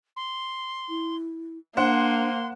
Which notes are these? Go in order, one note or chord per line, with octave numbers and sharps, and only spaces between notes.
C6
E4
A#3 D4 C5 F#5 C6